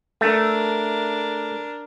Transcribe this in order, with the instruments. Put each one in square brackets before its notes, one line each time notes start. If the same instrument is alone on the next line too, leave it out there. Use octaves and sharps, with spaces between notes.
[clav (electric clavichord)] A3 [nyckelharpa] D4 A#4